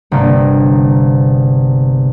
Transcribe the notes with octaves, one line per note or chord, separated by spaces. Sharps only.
G1 C3 A#3